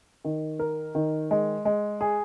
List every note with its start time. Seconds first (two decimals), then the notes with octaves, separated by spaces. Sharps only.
0.25 D#3
0.59 A#4
0.95 D#3
1.31 G#3
1.65 G#3
2.01 G#4